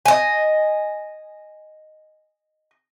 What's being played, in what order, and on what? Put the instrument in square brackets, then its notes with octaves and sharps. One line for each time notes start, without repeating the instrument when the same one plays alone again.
[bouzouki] D#5 G#5